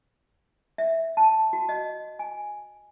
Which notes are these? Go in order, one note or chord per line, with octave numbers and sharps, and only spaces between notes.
E5
A5
F#4
D#5
G#5